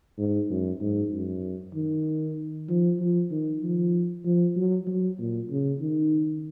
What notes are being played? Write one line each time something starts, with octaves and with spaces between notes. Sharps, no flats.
G#2
F#2
G#2
F#2
D#3
F3
F3
D#3
F3
F3
F#3
F#3
A#2
C#3
D#3